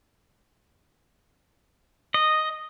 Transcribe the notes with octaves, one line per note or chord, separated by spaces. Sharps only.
D#5